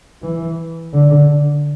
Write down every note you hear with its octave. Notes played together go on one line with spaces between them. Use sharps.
E3
D3